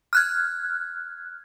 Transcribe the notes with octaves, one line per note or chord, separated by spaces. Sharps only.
F6 F#6 G#6